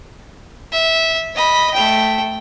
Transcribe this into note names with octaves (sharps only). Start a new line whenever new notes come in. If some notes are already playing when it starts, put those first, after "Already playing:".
E5
D#5 B5
A3 G5